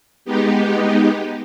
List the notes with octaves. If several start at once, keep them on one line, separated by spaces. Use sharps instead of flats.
G#3 B3 D#4 G4